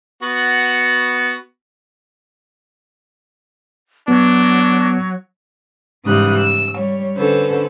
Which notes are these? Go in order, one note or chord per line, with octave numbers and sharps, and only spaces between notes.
B3 F#4
F#3 B3 D4
G#2 C#3 E3 G3 D#6 F#6
E6
G3 C#5
D3 C#4 A4 B4 C5